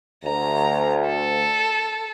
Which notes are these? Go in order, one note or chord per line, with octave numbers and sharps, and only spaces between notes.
D2 A#5
A4